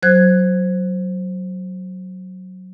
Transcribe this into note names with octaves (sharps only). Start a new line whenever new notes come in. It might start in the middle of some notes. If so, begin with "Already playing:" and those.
F#3 C5 F#6 G#6